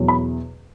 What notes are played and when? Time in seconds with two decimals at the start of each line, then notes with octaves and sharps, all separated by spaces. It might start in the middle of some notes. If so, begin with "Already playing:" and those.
Already playing: E2 B2 F#3
0.08 B5